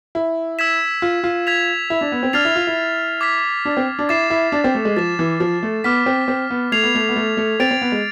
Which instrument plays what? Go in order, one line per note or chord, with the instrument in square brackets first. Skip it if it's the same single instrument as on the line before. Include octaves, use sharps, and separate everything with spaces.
[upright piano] E4
[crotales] E6 G#6 B6 E7
[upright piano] F4
F4
[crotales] G#6 B6 F7
[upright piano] E4
D4
B3
C4
[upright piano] D4 [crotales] F6 A6 C7 F7
[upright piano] E4
F4
E4
[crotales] D6 G#6 B6
[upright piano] D4
C4
D4
[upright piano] E4 [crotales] D6 A6 C7 E7
[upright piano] E4
D4
C4
A3
G#3
[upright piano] F3 [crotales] A6 E7
[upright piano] E3
F3
A3
[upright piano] B3 [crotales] D6 F6 B6
[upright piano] C4
C4
B3
[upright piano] A3 [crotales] G#6 C7 F7
[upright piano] B3
A3
B3
A3
A3
[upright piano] C4 [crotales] A6 D7 F7
[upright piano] C4
B3
G#3